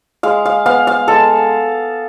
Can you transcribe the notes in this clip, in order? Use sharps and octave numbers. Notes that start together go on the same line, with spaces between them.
G#3 F5
F5
B3 F5
F5
G#3 A4